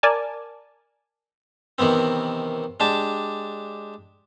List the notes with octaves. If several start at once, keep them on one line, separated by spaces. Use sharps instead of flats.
A#4 D5 G#5 A5
C3 D#3 E3 B3 C4
G#3 D4 G4 A5